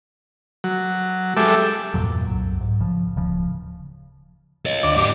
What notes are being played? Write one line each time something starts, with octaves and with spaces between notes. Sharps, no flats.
F#3
G#3 G4 A4 E5 D6
E2 G2 A#2 F#3
C2 F#2 F#3
G#2
A#1 C#3 F3
D1 C#3 F3
C#5 D#5
D2 D5 D6
G#2 G4